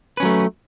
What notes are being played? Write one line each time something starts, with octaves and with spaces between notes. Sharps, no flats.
F#3 A3 C#4 B4